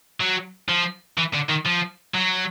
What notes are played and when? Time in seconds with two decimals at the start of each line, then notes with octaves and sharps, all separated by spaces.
0.20 F#3
0.69 F3
1.18 E3
1.34 D3
1.50 D#3
1.66 F3
2.15 F#3